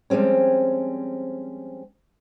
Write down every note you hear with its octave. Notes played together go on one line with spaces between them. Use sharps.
F3 G3 G#3 C4 C#4